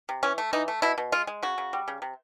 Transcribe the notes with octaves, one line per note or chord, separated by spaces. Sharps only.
C3
E3 C#4
A3
E3 D#4
A3
B2 E4
B2
G#3 F4
G#3
C#3 F#4
C#3
G3
C#3
C3